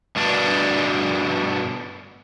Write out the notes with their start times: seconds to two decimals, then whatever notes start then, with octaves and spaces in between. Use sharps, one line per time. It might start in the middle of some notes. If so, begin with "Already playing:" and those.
0.16 G2 B2 D4